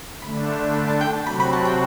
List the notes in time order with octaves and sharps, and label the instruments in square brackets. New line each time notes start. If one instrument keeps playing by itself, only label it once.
[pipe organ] D3 A3 D4 [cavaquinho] B5
[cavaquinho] B5
A5
G5
A5
[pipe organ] C3 F#3 C4 F#4 [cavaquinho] B5
[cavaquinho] B5
A5
G5